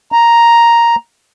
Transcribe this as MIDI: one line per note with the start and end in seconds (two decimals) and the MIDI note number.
0.12 0.95 82